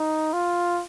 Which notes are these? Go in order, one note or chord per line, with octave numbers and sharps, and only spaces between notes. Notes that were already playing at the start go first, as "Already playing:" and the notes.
Already playing: D#4
F4